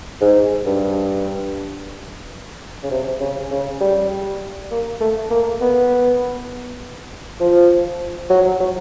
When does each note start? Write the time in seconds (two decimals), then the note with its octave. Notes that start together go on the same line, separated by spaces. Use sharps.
0.21 G#2
0.66 G2
2.83 C#3
2.91 C3
3.21 C#3
3.51 C#3
3.81 G3
4.71 A#3
5.01 A3
5.31 A#3
5.61 B3
7.40 F3
8.30 F#3
8.60 F#3